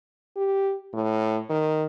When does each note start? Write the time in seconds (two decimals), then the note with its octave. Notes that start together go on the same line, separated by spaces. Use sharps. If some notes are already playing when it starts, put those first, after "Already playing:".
0.36 G4
0.94 A2
1.50 D#3